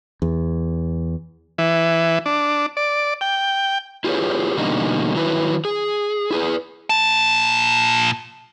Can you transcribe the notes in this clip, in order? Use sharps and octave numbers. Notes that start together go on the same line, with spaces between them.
E2
E3
D4
D5
G5
E4 F4 G4 G#4 B4 C#5
B2 D3 E3 G3 A#3 D#4
D#3 F#3 E4 B4
G#4
E4 G#4 B4
A#2 A5